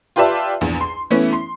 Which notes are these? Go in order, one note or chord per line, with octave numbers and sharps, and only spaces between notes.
F4 G4 B4 D5 E5 A5
A#1 E2
C6
E3 A3 B3 C#4 E4
C6